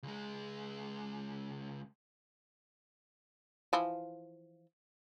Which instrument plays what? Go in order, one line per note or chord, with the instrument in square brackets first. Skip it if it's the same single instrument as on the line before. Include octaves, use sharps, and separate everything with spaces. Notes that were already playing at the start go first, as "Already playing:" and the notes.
[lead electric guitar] C#2 G#3
[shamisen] E3 F3